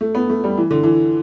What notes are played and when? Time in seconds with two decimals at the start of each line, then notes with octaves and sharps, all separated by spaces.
0.01 A3
0.15 B3
0.30 A3
0.44 G3
0.57 E3
0.71 D3
0.83 E3